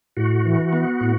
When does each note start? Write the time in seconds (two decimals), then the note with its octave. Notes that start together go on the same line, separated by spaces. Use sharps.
0.17 A2 F#4
0.45 E3
0.73 B3
1.01 A2